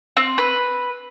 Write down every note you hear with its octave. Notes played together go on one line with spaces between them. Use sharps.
C4
B4